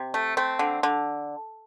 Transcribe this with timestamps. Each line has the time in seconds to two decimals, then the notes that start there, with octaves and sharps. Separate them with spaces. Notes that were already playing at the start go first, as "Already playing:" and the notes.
Already playing: C3
0.14 A3
0.37 A3 C4
0.59 D3
0.83 D3